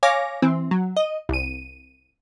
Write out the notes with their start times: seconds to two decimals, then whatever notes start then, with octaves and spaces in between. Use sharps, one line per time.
0.03 C#5 F5 G#5 D6 A#6
0.42 E3 C4
0.71 F#3
0.97 D#5
1.29 C2 D#7